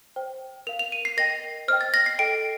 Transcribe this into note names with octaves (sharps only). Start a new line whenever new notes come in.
C5 G5
A#4 F5 F7
F7
D#7
C7
A#4 D#5 G5 A#6
C5 D#5 G5 F6
A6
A#6
C7
A4 D#5 G5 D7